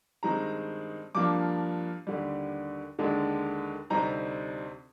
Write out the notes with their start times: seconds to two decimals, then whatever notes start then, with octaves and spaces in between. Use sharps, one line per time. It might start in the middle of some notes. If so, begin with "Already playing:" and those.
0.23 G2 D#3 G#3 C4 D#4 A#5
1.15 G2 F3 A#3 D4 D6
2.07 D#2 D3 G3
2.99 D#2 D3 G#3 D4
3.90 D2 C3 G3 C4 D#4 A#5